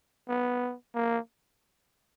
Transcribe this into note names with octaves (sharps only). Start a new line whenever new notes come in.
B3
A#3